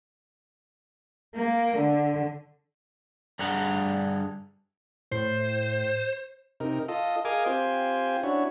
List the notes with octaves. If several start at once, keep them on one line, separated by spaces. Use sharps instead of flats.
A#3
D3
G2 D3 G#4 F#5 A#5
A2 C5
C3 D#4 A#4
F4 A4 D#5
G#4 A#4 D#5 F5 G#5 D6
C4 F4 G4 C5 G#5
C#4 D4 E4 F#4 C#5